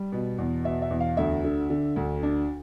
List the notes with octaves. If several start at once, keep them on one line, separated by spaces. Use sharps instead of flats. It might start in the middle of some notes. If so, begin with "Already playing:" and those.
Already playing: G3
B2
E2
B2 E5
E5
E2
F5
D2 E5
D3
D3
D2
D4